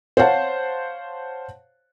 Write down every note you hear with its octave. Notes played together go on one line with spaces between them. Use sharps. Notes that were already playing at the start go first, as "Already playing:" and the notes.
C5 C#5 F5 F#5 A5